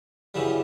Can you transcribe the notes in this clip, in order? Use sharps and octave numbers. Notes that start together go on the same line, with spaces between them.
F#2 C#3 E3 G3